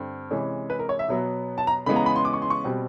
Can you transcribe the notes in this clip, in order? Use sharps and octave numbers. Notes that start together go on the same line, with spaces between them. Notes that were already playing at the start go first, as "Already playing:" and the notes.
Already playing: G2 D3 C4
C3 E3 G#3 C#4
B4
A#4
C#5
E5
B2 F#3 B3
A5
A#5
C#3 E3 G#3 B3 B5
A#5
B5
C6
D6
C#6
C6
C#6
B2 G3 C4